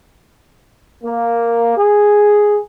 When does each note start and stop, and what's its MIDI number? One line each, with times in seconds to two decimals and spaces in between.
1.04 1.72 58
1.77 2.58 68